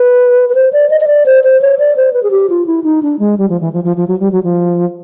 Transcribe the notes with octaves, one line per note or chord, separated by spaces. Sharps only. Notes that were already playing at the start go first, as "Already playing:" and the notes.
Already playing: B4
B4
C5
D5
D#5
D#5
D5
C5
C5
C#5
D5
C5
B4
G#4
G4
F4
E4
D#4
D4
G#3
G3
F3
E3
F3
F3
F3
F#3
G3
F#3
F3